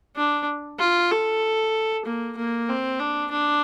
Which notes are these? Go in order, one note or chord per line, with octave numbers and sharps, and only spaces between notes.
D4
F4
A4
A#3
A#3
C4
D4
D4